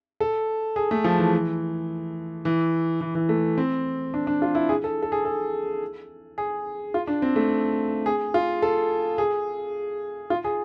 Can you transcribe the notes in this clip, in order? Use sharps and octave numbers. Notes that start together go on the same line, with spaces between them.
A4
G#4
A3
F3
E3
E3
E3
E3
A3
C4
D4
D4
F4
E4
G#4
A4
A4
G#4
A4
G#4
F4
D4
C4
A3
G#4
F4
A4
G#4
F4
G#4